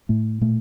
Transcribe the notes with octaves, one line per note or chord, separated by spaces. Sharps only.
A2 A3
A#2 A3